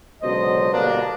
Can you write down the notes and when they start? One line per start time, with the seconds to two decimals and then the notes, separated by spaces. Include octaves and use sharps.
0.23 C#2 B2 D3 F#3 C5 D#5
0.72 G1 B2 A#3 D4